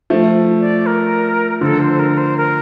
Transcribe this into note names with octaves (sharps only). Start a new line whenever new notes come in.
F3 A3
D5
A#4
D3 F3 A4
C5
A#4
C5
A#4